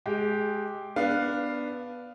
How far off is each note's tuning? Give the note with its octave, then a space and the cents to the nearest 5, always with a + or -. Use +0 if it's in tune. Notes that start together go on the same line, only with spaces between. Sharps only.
G#3 +15 G4 -5
B3 +0 D4 +0 F5 +0